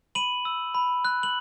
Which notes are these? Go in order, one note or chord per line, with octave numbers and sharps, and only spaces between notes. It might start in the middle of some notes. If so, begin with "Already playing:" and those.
B5 D#7 F#7
E6
B5
F#6
F#7